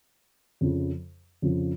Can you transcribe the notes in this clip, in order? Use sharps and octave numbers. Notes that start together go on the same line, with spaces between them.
F2 C#3 F3
F2 C#3 F3